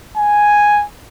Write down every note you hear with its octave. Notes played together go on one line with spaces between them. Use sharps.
G#5